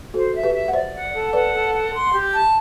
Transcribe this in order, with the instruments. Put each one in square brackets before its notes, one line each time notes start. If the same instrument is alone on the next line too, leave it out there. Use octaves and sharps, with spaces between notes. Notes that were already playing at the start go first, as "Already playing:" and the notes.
[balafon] F#4 A4 [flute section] C5
[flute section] E5
[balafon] G4 B4
[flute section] E5
[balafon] F#5
[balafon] C5 E5 [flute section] D5
[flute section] F#5
A4
[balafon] B4 D5 [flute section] F#5
[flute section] A4
F#5
C6
G4
A5